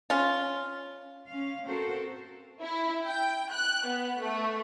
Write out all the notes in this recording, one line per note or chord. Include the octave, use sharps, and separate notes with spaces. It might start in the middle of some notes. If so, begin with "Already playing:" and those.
C#4 F4
C#4 F5
C4 F#4 A4 A#4 C5
E4
G5
F#6
B3
A3